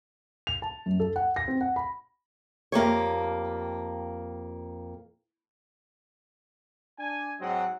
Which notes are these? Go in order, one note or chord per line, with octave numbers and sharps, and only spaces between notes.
F7
A5
F#2
A4
F#5
A#6
C4
F#5
B5
F2 A#3 G4 C#5
D4 G#5
G#2 F#3 C4 D#5 F#5